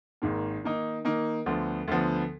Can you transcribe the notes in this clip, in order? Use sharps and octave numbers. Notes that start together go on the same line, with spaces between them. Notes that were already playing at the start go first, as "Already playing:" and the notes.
G#1 G#2 D#3 A#3
D#3 A#3 D#4
D#3 A#3 D#4
D2 D3 F3 B3
D2 D3 F3 B3